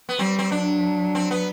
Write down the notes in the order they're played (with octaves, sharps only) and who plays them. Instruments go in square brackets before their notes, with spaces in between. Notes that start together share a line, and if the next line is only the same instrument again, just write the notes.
[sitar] B3
[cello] G3 [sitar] C4
[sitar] C4
[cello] F#3 [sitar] D4
[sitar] C4
B3